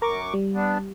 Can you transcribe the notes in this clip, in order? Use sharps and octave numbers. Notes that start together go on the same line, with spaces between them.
F#2 A#4 A#5 C#6 D6
G3
B3 D4